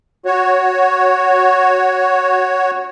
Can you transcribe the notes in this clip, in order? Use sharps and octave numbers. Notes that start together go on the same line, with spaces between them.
F#4 C#5